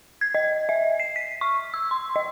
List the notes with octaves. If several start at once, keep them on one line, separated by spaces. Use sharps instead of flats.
G#6
D#5
E5
C7
B6
C#6
E6
C6
D#5